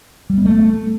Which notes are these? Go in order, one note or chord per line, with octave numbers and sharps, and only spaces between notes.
G3
B3
A3